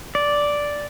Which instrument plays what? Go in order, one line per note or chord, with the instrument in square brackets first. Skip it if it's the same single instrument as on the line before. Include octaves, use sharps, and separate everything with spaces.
[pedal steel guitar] D5